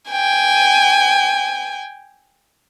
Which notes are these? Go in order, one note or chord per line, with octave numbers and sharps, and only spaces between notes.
G5 G#5